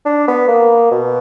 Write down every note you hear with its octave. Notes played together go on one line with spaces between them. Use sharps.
D4
B3
A#3
B2